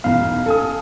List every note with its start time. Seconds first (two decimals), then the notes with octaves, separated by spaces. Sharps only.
0.04 B1 E2 F5
0.46 A4 G#5 D#6